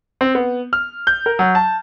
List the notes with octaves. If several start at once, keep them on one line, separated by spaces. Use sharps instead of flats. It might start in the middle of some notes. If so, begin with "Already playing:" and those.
C4
B3
F6
G6
A#4
F#3
A5